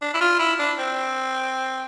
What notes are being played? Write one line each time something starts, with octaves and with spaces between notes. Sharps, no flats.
D4
E4
F4
E4
D4
C4